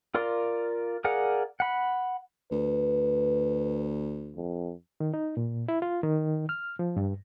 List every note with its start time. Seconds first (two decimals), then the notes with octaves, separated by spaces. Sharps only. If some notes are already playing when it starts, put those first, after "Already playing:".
0.14 F4 A#4 D5 C6
1.04 G#4 A#4 D5 F5 F#5
1.60 F#5 B5
2.52 D2 B4
4.36 F2
5.00 D#3
5.14 D#4
5.37 A#2
5.68 E4
5.82 F4
6.03 D#3
6.49 F6
6.79 F3
6.97 G2